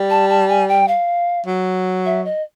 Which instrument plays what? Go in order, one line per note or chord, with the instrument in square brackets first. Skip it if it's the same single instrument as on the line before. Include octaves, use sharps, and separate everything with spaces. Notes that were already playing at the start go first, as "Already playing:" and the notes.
Already playing: [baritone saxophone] G3
[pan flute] A5
A5
G#5
G5
F5
[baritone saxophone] F#3
[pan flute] E5
D#5